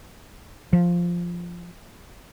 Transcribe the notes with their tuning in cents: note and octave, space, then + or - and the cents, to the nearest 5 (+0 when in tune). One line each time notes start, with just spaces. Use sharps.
F3 -5